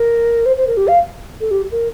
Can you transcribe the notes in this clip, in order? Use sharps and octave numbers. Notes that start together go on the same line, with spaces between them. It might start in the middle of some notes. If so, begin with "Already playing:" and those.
Already playing: A#4
C5
C5
A#4
G4
F5
A4
G4
A#4